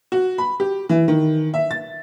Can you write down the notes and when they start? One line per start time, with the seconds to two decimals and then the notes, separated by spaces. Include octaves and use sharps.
0.12 F#4
0.38 B5
0.60 G4
0.89 E3
1.08 D#3
1.54 E5
1.71 A6